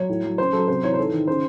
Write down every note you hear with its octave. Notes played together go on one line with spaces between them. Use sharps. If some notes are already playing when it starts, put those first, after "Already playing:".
Already playing: F#3 C#5
A2
F#3
C#3 C5
F#3 A4
C3 C5
E3 C#5
C5
G#2 A4
D#3
C#3 C5